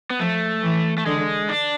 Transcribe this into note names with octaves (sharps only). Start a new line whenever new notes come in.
B3
F3 A3
E3
A3
D3 G#3
D4